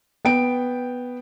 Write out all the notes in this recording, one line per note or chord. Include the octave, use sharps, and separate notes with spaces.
B3 G5 D7